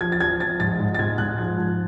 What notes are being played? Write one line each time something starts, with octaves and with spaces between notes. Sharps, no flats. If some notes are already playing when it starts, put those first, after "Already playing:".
F3 G#6
A6
F3 G#6
F3 A6
G#2 A6
G#2
A6
G#2 G#6
G#2 F#6
F3 G#6
F3